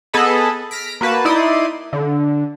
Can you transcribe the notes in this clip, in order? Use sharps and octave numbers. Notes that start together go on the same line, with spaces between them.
B3 G#4 A4 D#5 A5 B5
F6 A#6 B6 D7
A#3 F#4 B4 A5
D#4 E4 D5 C6 D#6
D3